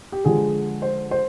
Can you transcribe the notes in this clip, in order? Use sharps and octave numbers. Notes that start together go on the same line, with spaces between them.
G4
D3 F3 G#3 G#4
C5
C5